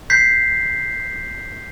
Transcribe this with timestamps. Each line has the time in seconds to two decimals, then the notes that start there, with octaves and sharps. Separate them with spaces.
0.10 G6 B6 C7